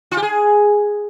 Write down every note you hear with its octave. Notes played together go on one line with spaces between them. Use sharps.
F4
G4
G#4